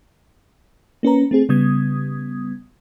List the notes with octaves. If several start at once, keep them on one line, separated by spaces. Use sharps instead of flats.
A#3 C#4 B4 A#5
A3 C4 G#4
C#3 G3 B3 D#6 G#6